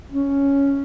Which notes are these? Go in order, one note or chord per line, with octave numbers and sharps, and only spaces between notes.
C#4